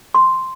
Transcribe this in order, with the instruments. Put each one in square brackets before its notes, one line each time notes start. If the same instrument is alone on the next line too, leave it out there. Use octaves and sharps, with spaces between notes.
[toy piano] C6